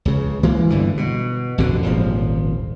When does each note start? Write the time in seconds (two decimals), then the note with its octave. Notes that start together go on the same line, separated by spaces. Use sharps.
0.05 C#2 C#3
0.43 E3 G#3 A#3
0.70 G1 G2 D3 E3
0.97 B2
1.58 A1 F2 B2 D3
1.83 D#1 G#1 F3